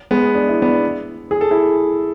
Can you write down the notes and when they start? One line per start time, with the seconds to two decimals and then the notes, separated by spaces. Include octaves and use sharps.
0.11 G#3 B3
0.35 D4
0.49 E4
0.62 B3 D4
1.31 G#4
1.41 A4
1.51 E4 G#4